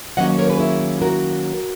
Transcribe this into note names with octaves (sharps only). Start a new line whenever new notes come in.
D#3 F#3 A#3 C#4 D#5 F#5
A#4 C#5
G#4 B4
E4 G#4
F#4 A#4